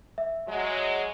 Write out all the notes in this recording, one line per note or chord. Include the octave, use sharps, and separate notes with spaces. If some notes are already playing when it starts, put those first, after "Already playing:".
E5
F#3 G#3